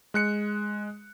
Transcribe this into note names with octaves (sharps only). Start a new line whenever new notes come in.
G#3 F#6 C#7